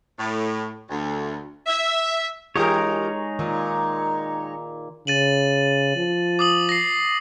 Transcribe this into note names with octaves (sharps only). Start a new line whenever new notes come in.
A2
D2
E5
E3 G#3 D#4 G4 G#4 A#4 C#5
A#2 D#3
C#3 A6 D#7 F#7
F3
D6 D#6 F#7
A#6 C7